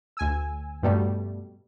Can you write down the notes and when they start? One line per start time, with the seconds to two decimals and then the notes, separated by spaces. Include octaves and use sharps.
0.17 D2 G#5 E6
0.83 G2 B2 G3 A3